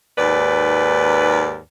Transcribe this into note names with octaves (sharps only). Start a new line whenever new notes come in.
D#2 G#2 B4 D5